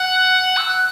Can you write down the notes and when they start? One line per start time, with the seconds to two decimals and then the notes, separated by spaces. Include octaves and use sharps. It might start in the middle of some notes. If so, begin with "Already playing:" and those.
Already playing: F#5
0.57 E6
0.68 F#6